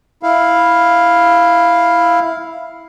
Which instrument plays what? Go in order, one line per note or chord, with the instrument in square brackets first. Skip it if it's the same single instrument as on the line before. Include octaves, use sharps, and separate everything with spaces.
[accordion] E4 F5